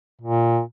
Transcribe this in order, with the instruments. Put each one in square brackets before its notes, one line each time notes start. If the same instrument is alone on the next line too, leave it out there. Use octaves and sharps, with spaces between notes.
[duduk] A#2